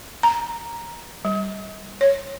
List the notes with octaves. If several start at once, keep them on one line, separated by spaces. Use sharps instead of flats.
A#5
G3
C#5